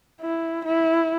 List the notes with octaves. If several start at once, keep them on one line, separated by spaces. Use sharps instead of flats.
E4
E4